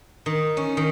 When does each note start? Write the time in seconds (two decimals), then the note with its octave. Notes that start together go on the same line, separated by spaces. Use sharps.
0.26 D#3
0.57 C#4
0.77 D#3